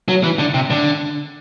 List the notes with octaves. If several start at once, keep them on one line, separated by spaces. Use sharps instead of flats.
F#3
E3
D3
C3
D3